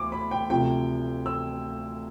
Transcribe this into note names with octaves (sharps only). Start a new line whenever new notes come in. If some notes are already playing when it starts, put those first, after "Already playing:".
Already playing: D2 D6
B5
G5
D2 C3 F3 G5
E6